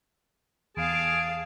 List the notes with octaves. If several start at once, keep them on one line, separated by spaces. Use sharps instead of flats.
E2 G#4 F5 A5 D7